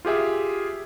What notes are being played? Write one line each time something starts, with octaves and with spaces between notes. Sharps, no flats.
F4 G4 G#4 E5